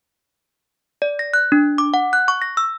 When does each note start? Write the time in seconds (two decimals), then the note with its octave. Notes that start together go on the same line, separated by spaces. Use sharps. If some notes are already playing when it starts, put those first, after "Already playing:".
1.02 D5
1.19 A#6
1.34 F#6
1.52 D4
1.78 D6
1.94 F#5
2.13 F#6
2.28 C#6
2.42 A#6
2.57 E6